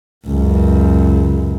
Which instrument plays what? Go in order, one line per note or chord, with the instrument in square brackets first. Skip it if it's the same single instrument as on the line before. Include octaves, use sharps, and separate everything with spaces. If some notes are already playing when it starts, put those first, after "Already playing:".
[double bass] C#2 F#2